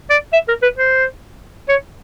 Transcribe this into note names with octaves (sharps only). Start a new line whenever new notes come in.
D5
E5
A#4
B4
C5
C#5